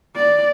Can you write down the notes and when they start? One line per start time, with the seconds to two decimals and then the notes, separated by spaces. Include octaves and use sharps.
0.16 D5